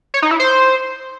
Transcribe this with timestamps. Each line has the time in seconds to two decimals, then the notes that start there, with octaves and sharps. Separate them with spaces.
0.14 C#5
0.22 D#4
0.31 E4
0.40 C5